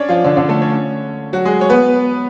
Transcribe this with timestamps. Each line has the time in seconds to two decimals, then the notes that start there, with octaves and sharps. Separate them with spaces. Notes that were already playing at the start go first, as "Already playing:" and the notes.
Already playing: C#4 D4 C#5 D5
0.09 F3 F4
0.24 D3 D4
0.37 D3 D4
0.49 A3 A4
0.61 C#4 C#5
1.33 F#3 F#4
1.45 G#3 G#4
1.61 C#5
1.70 B3 B4